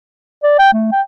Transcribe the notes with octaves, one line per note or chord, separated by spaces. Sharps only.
D5
G5
A3
G5